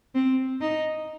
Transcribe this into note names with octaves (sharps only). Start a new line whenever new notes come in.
C4
D#4